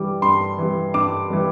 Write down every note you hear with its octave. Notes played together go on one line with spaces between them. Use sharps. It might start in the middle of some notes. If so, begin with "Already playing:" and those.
Already playing: G2 E3 G3 D6
G2 C6
E3 G3
G2 D6
E3 G3